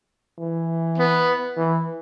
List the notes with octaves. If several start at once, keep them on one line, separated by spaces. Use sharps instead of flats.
E3
B3
E3